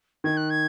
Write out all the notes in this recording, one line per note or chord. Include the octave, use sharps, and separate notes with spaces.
D#3 G#6
F#6
G#6